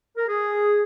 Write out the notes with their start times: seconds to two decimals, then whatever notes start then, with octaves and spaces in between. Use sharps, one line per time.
0.17 A#4
0.28 G#4